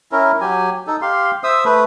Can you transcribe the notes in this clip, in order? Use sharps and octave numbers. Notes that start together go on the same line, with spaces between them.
C#4 E4 A#4
F#3 G4 G#5
D#4 A4
G4 F5 C6
C5 E5 D#6 E6
A3 B4